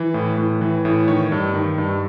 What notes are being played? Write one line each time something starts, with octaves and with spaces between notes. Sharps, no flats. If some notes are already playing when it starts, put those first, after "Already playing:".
Already playing: E3
A2
A2
E3
A2
D#3 C#5
G2
D#3
G2